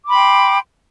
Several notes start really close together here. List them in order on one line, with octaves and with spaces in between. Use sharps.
D6 B5 C6 G5